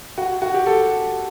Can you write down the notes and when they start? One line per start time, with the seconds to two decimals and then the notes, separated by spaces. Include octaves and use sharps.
0.18 F#4
0.42 F#4
0.54 G4
0.67 A4